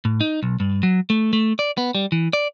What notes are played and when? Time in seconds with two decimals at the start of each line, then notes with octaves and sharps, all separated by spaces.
0.05 A2
0.21 D#4
0.43 B1
0.60 G2
0.83 F#3
1.10 A3
1.33 A3
1.59 D5
1.78 B3
1.95 G3
2.12 E3
2.33 D5